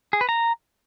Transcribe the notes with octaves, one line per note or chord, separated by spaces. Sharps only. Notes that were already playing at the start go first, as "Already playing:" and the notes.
G#4
B4
A#5